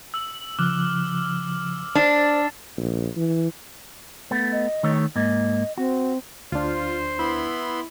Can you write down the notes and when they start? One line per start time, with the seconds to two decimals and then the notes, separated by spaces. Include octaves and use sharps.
0.14 E6 F#7
0.59 C#3 F3 D6 F6 F#6 G7
1.95 D4 C5 D5 A6 C7 E7
2.77 A#1
3.16 E3
4.31 A3 B3
4.52 D#5
4.83 D#3 A3 C#5
5.16 G#2 A#3 D#5
5.78 C4 F#4
6.52 D2 D4 F4 C5
7.19 B3 E4 B5 C6